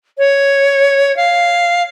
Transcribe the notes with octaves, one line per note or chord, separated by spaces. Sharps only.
C#5
F5